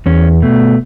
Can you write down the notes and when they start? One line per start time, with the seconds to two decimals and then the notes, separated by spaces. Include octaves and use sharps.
0.06 E2 C#4
0.42 B2 A3